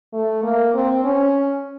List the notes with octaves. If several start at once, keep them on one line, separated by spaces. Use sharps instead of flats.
A3
A#3
C4
C#4